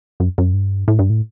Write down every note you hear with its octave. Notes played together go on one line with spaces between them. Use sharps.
F#2
F#2
G2
A2
G2
A2